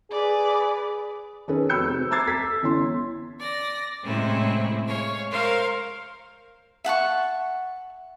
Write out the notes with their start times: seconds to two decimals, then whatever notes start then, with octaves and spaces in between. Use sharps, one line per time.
0.11 G#4 B4 D5
1.48 D#3 C#4 G#4 A4 B4
1.69 F1 F#4 B5 E6 G6 C#7
1.88 C4
2.11 A#5 D6 E6 G#6 A6 C7
2.27 A4 G#6 B6
2.63 G1 E3 C#4 C6
3.40 D5 A#6
4.04 A2 C3 G#3 C4 C#4 E4
4.85 G#3 C#5 F5
5.31 A#4 C5 F5 C6 C#6
6.84 E5 F#5 A5 C#6